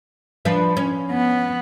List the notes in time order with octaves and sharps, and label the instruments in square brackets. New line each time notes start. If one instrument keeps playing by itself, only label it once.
[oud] F3 D4 B4
C#4
[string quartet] B3